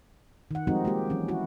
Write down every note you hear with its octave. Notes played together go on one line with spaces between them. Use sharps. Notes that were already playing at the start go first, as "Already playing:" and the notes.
D#3 F#5
F3 G3 G#3 C4 D#4 F#4
G#3 A#3 G4
E3 F#3 C#4
E4 F#4